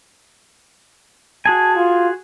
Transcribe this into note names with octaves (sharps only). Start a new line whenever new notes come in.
F#4 G#4 G#5 A5
F4